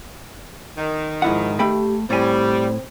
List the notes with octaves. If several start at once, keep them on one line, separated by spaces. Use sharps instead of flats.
D#3
G#2 F3 E4 F#5
A3 G4 G5 B5
A2 G3 C4 G#5